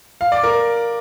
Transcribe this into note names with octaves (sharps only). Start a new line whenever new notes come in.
F5
D5
A#4